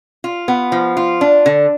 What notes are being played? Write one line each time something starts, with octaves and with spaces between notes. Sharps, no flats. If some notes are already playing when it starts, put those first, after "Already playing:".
F4
B3
F3
F4
D4
D3